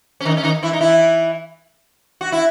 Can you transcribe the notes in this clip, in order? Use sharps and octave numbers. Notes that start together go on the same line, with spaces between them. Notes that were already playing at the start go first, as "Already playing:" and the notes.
C#4
D#3 D#4
C#4
D#3 D#4
E3 E4
D#4
E3 E4
F#4
E4